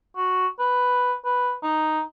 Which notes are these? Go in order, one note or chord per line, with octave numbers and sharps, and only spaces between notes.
F#4
B4
B4
D#4